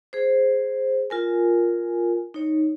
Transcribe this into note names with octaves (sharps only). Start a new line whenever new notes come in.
G#4 C5
F4 A#4 G#5
D#4 C#5